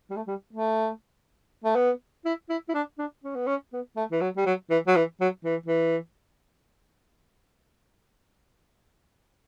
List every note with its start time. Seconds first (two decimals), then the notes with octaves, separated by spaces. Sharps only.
0.11 G3
0.16 A3
0.27 G3
0.53 A3
1.64 A3
1.76 B3
2.25 E4
2.49 E4
2.69 E4
2.74 D4
2.99 D4
3.24 C#4
3.35 B3
3.47 C#4
3.73 B3
3.97 A3
4.12 E3
4.21 F#3
4.37 G3
4.46 F#3
4.70 E3
4.87 F#3
4.96 E3
5.21 F#3
5.45 E3
5.66 E3